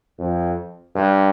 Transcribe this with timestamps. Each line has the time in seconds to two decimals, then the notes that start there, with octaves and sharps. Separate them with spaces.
0.19 F2
0.96 G2